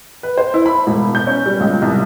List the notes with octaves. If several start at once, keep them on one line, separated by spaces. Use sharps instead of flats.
B4
C5
E4
B5
E1
G6
C#4
G3
C#2
C2